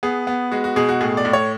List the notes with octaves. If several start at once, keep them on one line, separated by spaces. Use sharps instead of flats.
B3 G#4
B3
G#3 F#4
F#4
B2 G#4
F#4
A2 G#4
D5
A2
C#5